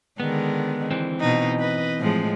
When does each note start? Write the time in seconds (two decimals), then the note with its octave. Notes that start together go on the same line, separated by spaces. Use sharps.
0.20 D3 D#3 G#3 B3
0.91 E3 C4
1.20 B2 D#4
1.60 B4 D#5
1.99 A2 F3 G#3